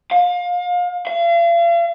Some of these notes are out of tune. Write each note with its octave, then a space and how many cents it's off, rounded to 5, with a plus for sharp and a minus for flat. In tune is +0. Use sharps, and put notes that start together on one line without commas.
F5 +30
F5 -40